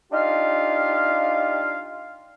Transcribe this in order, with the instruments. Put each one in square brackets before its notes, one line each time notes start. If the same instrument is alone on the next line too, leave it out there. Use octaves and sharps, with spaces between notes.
[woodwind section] D4 D#4 F4 G4 F5